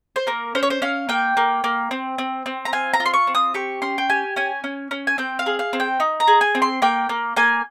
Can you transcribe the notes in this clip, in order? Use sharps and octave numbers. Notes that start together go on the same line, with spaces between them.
C5
A#3 A#4
C#4 C5
C#5
C5
C#4 F5
A#3 G5
A#3
A#3
C4
C4
C4
A#5
F4 G#5
A#5
F4
C6
C#6
C4
D#6
G4 C#6
C#4 C6
G5
G4 G#5
C#4 G#5
C#4
C#4
G#5
C4 G5
F5
G#4
F5
C4
G5
D#4
A#5
G#4
G#5
C4
C6
A#3 G5
A#3
A#3 G#5